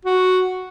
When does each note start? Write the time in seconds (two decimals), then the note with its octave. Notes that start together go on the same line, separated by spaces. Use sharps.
0.05 F#4